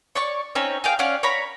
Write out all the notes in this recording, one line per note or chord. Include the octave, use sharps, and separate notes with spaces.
C#5 D5 C#6
C4 C#4 D#4 C#5
G#4 F5 G5
C#4 D5 F5 F#5
C#5 A#5 B5